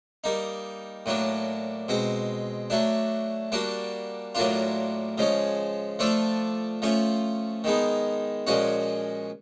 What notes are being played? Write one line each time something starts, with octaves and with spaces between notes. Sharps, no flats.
G3 A#3 D#4
A2 F#3 A#3 D4
B2 G#3 C4
F#3 A3 D4
G3 A#3 D4 F#4
A2 F#3 A#3 D4 F4
C#3 F3 G#3 C#4
F3 A3 D4 F4 A4
F3 A3 C#4 F4
D#3 G#3 B3 D#4
A#2 F3 G#3 C#4 F#4